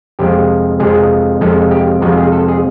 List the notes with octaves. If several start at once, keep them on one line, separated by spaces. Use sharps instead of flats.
F2 C3 F3 G#3 G4
F2 C3 F3 G#3 G#4
F2 C3 F3 G#3 A4
G4
F2 C3 F3 G#3 F#4
G#4
A4
G#4